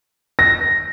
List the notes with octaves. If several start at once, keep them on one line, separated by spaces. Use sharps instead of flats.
A#6